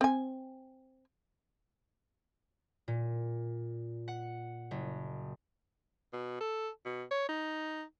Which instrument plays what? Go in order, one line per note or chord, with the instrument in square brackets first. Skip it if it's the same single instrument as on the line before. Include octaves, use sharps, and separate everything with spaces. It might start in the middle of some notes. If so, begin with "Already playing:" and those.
[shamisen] C4 G#5
[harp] A#2
F#5
F#1
[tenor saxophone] B2
A4
B2
C#5
D#4